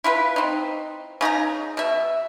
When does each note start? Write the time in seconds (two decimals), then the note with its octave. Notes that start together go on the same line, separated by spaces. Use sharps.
0.04 E4 F4 A#4 B4
0.36 C4 D#4
1.21 C#3 D#4 F4 A#5
1.77 B2 E5